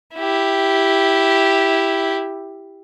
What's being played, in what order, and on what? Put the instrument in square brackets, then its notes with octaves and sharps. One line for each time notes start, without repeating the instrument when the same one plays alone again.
[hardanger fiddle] E4 G4